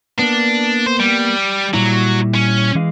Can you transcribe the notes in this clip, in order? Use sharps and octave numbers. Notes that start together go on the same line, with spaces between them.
A#3 B3 D4
C5
G3
A#2 F#3 G3 E4
C#4
E3 G#3 F5